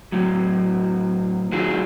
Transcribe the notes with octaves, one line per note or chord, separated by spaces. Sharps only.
A2 F#3
D#3 F#3 E4 F4 G#4